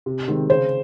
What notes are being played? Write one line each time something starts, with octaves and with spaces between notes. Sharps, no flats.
C3
D#3 G#3 C4
C#3 C5